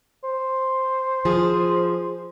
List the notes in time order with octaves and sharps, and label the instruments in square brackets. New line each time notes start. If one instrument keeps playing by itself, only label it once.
[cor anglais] C5
[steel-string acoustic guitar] F3 G#4